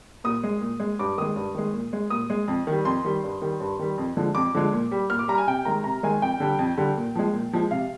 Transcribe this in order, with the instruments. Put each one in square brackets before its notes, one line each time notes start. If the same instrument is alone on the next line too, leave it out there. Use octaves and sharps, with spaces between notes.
[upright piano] A#2 D#6
G#3
A#2
G#3
G2 D6
D#3 G#3 D#6
G2
D#3 G#3
A#2
G#3
A#2 D#6
G#3
F2
D#3 G3
F2 C6
D#3 G3
G2
D#3 G3
G2
D#3 G3
F2
D3 F3 G#3
F2 D6
D3 F3 G#3
A#2
G3
A#2 F6
D6
G3 A#5
G#5
C3 G5
D#3 G#3 A#5
C3 A#5
D#3 G#3 G#5
F2 G5
D3 G3
F2
D3 G3
A#2
F3 G#3
A#2
F3 G#3
C3 F5